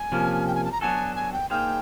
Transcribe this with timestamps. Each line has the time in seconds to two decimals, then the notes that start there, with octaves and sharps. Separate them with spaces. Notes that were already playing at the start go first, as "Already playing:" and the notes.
Already playing: G#5
0.12 C3 F3 A#3 C#4
0.47 G5
0.55 G#5
0.64 A5
0.72 A#5
0.81 F#3 B3 D4 F#4 A4 G#5
1.15 G#5
1.33 G5
1.50 A#3 D#4 G#4 C5 F5 G5